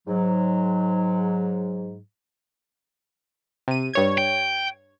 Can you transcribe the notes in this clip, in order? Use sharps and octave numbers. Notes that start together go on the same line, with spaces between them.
G#2 F#3
C3 D#7
G2 C#5 G#6
G5